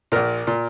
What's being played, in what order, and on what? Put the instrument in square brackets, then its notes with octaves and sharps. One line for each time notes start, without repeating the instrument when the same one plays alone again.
[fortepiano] A#1 A#2 A#4
A#2